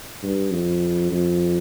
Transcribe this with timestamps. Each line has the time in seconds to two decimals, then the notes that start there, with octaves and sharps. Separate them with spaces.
0.23 G2
0.52 F2
1.12 F2